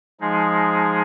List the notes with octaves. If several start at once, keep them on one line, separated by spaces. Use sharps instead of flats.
F3 G#3 D#4 G#4